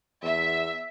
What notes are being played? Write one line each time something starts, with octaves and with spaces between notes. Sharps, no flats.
E2 E5